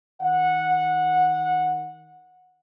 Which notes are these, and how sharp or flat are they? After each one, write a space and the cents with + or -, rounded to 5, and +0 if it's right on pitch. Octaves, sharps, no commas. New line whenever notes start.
D#3 +20 F#5 -15